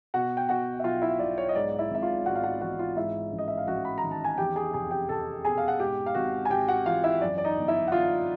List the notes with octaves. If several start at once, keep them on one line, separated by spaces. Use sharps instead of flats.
B2 F#4 F#5
G5
B2 F#4 F#5
E5
B1 F4 F5
E4 E5
B1 D5
C#5
D#5
G#2 D5
E4 E5
G#1 E5
F4 F5
G#1 F#4 F#5
F5
F#4 F#5
E3 F#4 F#5
F4 F5
G#2 E4 E5
A1
D#5
E5
F5
A1 F#4 F#5
B5
A#5
D#3
A5
G#5
E2 G4 G5
G#4 G#5
F1 G#4 G#5
G4 G5
F1 A4 A5
B2 G#4 G#5
F5
F#5
G#2 G4 G5
F5
G#1 F#4 F#5
G#5
G#1 G4 G5
F#4 F#5
E3 F4 F5
E4 E5
F#2 D5
D5
D#4 D#5
G1
E4 E5
F#5
G1 F4 F5